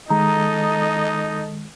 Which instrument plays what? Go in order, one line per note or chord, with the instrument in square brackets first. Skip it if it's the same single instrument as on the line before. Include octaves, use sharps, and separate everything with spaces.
[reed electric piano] D#3 G#3 [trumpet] D#4 [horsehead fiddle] A4 D#5 [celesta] A#5